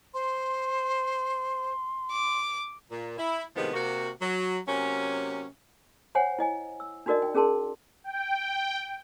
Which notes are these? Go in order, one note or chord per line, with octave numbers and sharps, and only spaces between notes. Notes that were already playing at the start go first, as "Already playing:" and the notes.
C5 C6
D6
A#2
E4
A2 C3 D#3 F3 G#3 B3
C3 A#3 F#4
F#3
C3 F#3 A#3 C#4
C5 C#5 F#5 G#5
E4 D#5 G#5
E6
D4 D#4 F#4 A#4 D5 D#5
G5
C#4 G#4 A#4 A5 C6
G5